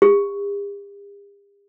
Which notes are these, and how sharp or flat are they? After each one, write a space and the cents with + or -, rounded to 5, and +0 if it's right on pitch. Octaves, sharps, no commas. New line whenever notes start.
G4 +45